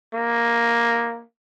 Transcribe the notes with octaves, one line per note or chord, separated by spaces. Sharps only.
A#3